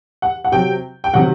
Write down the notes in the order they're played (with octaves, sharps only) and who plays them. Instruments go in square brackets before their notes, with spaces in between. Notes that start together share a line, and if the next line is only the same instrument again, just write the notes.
[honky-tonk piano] F#5
F#5
C3 F#3 G5
G5
C3 D#3 F#3 F#5